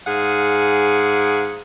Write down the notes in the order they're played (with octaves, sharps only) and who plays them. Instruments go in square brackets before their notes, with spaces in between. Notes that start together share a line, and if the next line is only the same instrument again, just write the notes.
[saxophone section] G#2 G#4 F5 F#5